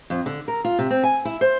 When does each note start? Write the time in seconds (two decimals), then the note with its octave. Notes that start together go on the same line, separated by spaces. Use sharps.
0.10 F2
0.26 D3
0.48 A#4
0.65 F4
0.79 C3
0.90 C4
1.04 G#5
1.25 E4
1.41 C5